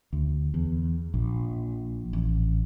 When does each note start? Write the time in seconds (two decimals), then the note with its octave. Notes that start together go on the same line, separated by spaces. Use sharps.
0.13 D2
0.54 E2
1.14 A#1
2.13 A1